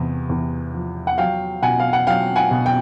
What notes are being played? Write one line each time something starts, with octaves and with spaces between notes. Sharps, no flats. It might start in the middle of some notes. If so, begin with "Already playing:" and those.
Already playing: E2 C3
E2
F3
F#5
F#3 F5 G5
B2 F#5 G#5
F5
F#5
F#3 F5 G5
F#5 G#5
B2
G5